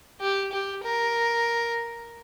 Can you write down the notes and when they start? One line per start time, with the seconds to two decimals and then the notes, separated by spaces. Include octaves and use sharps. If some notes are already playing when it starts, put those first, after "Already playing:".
0.21 G4
0.52 G4
0.83 A#4